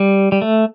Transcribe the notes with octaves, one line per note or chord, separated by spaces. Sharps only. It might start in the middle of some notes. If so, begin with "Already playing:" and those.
Already playing: G3
G3
A3